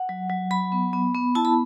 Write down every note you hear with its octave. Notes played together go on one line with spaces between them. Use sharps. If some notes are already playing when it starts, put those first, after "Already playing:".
Already playing: F#5
F#3
F#3
F#3 B5
B3
B3
B3
E4 A5
B5